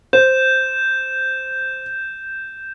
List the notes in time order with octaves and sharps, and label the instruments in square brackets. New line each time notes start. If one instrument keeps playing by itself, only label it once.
[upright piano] C5 [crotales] G6 E7